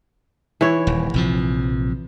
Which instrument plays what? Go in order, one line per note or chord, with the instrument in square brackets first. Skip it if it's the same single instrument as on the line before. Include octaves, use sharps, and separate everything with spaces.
[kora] E3 C#5
[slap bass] D#1
A#1 C3 F3